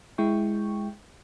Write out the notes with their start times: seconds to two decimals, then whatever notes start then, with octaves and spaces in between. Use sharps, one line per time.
0.18 G#3 E4 G5 C#6